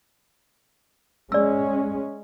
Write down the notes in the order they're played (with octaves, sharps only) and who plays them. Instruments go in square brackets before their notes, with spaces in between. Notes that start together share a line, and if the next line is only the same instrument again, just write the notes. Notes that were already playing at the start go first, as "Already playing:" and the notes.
[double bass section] G#3 C#4 [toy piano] D5 E6